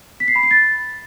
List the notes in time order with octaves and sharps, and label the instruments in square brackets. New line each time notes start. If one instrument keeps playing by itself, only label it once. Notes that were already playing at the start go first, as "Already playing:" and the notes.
[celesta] B6
C7
B5
C7
A6